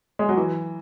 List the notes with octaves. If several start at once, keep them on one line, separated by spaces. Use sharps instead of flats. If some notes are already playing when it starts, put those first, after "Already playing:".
G#3
F#3
E3